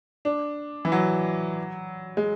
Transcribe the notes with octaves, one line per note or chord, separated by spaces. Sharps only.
D4
E3
F#3
G#3